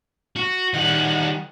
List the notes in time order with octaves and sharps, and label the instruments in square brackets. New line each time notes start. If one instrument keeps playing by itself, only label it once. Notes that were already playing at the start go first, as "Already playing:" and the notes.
[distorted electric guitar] F#4
[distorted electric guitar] D#3 G3 [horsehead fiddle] G#4 F#5